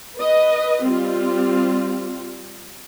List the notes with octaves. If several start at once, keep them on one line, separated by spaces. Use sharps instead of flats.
B4 D#5
G3 C4 F4